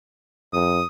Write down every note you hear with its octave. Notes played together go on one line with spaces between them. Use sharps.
F2 D#6